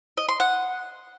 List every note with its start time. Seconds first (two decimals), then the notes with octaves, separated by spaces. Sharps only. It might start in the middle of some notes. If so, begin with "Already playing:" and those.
0.17 D#5
0.29 C6
0.40 F#5